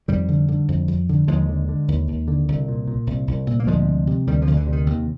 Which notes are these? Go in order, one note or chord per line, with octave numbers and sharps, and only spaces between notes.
F2 D#3 G3
D3
D3
F2
F2
D3
D#2 F3 G#3
D3
D3
D#2
D#2
D3
C2
A#2
A#2
C2
C2
A#2
A#3
D2 F3 G#3
C3
C3
D2 D#3 G3
D3 F3
D2
D3
C3
D#3
D#2